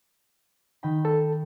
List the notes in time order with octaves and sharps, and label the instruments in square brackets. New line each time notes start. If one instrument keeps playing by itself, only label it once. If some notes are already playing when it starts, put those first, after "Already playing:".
[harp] D#3 G5 B5
[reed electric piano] A4